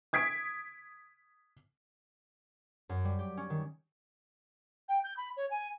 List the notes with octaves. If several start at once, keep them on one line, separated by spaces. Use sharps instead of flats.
D#6 G#6 B6 D7
F#2
G3
G4
C#4
D#3
G5
G6
B5
C#5
G#5